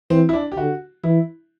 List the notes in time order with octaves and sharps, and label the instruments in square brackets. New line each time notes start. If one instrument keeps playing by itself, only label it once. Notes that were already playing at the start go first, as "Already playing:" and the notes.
[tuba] E3 [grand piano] C4
[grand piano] E4
D4
G4
[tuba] D3 [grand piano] F#4
[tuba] E3 [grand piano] E4